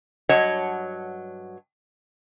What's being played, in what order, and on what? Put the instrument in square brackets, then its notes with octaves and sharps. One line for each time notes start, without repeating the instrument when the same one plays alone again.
[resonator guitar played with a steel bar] G2 F#3 C#5 D#5 F#5 A5